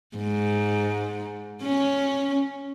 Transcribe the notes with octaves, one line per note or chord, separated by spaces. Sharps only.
G#2
C#4